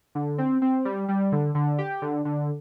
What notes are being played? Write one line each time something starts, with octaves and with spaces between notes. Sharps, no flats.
D3
C4
C4
G3
G3
D3
D3
G4
D3
D3